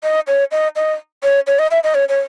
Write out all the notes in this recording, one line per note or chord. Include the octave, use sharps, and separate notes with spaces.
D#5
C#5
D#5
D#5
C#5
C#5
D#5
E5
D#5
C#5
C#5